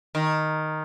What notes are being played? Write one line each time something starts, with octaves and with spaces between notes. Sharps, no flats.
D#3